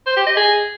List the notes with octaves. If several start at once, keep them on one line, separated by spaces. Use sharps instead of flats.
C5
G4
D#5
G#4